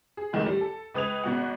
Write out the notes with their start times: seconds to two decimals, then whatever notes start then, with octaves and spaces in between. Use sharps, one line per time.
0.17 G#4
0.33 D#2 A2 D3 D#3 G#3
0.46 G3
0.61 A4
0.94 C#2 B4 D#6 G#6 F7
1.23 G#1 B2 F#4 F#5